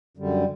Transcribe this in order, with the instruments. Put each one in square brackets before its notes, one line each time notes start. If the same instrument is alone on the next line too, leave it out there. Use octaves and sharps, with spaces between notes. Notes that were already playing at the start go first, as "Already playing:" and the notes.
[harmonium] F#2 D3 G3